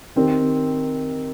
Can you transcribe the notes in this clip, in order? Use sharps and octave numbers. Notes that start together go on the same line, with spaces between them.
D#3 C4 G4 A#4